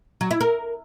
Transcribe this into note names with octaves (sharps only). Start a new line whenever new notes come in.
F#3
E4
A#4